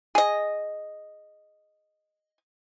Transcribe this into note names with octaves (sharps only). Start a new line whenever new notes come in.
G#4 D#5